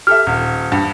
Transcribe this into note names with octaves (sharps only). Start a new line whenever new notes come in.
G4 A4 E5 F6
D#1
G2